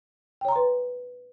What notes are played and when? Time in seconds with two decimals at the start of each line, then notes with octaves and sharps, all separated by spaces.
0.41 G5
0.45 C#5
0.48 A#5
0.52 C6
0.56 B4